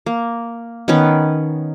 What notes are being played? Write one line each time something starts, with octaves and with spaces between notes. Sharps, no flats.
A#3
D#3 B3 C#4 B4